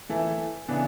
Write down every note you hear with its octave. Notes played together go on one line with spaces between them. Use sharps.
E3 A3 E4 A4
C#3 E3 B3 D4